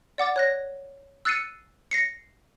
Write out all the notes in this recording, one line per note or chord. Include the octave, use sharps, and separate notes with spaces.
D5 F#5 D6 A6
C#5 F#6 A#6
E6 F#6 A6 C7 C#7 D#7
A#6 C7 C#7